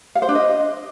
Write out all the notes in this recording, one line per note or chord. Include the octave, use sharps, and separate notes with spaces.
F5
C5
D4
D#5